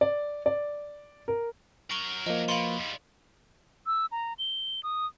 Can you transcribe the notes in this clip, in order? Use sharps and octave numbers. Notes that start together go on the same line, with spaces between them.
D5
D5
A#4
F#3 A#4 C#6 F#7 G7
F3 A#3 D#5
B2 F5 B5 C6
G#2 G3
E6
A#5
G7
D#6